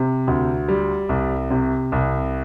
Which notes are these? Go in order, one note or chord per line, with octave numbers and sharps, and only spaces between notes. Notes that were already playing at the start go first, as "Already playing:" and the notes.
Already playing: C3
D2
G3
C2
C3
C2